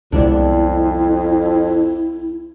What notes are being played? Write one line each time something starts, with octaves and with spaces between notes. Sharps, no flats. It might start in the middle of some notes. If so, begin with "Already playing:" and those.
C2 F2 C3 G#3 B3 D4 E4